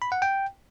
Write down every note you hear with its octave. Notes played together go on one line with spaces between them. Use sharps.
B5
F#5
G5